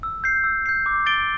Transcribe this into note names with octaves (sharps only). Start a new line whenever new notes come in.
E6
G6 C7
E6
G6 C7
D6
A6 D7 G7